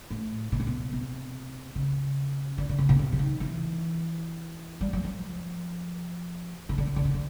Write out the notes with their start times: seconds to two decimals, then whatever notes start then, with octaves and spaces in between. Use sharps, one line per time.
0.11 A2
0.52 B2
0.60 C3
0.67 B2
0.93 C3
1.75 C#3
2.58 D3
2.69 D3
2.78 C#3
2.89 B2
2.99 C3
3.12 E3
3.19 D#3
3.40 E3
4.81 G3
4.93 F#3
5.05 F3
6.69 C#3
6.78 D3
6.87 C#3
6.96 D3
7.05 C#3
7.14 D3